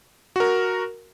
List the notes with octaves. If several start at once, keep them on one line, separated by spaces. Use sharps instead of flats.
F#4 A#4